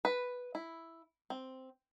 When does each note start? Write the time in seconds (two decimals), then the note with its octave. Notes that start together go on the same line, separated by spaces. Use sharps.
0.05 B4
0.55 E4
1.30 C4